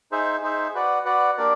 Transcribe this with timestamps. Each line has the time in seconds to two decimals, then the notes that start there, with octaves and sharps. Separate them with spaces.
0.11 D#4 G#4 C5 E5
0.42 D#4 G#4 C5 E5
0.74 F#4 B4 D5 F#5
1.05 F#4 B4 D5 F#5
1.37 A#3 D4 G4 A#4 D5